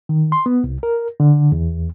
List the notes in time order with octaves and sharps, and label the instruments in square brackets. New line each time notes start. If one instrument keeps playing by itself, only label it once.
[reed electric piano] D#3
C6
B3
C2
A#4
D3
E2